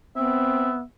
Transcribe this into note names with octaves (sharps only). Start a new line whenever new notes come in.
B3 C4 E5